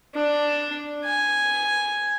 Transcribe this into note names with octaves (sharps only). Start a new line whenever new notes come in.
D4
G#5